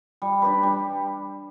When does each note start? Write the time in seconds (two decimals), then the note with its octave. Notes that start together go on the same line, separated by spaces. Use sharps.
0.22 G3
0.42 D4 G4 B4
0.63 G3